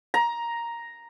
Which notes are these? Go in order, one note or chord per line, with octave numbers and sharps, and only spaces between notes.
A#5